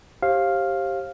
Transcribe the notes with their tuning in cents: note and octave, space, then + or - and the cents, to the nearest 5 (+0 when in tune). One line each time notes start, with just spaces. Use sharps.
G4 -5 C5 +40 F5 +0